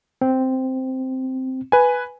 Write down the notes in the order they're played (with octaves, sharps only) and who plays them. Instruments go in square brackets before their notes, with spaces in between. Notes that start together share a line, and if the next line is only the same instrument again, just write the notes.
[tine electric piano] C4
[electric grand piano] B4 G#5